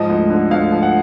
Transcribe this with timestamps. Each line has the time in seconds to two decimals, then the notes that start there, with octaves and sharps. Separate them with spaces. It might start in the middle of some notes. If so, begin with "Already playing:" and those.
Already playing: G#2 F3 D#5
0.10 D2
0.30 D3
0.51 D2 F5
0.72 F3
0.83 F#5